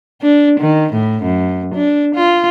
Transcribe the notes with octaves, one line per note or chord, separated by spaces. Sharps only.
D4
D#3
A2
F#2
D4
F4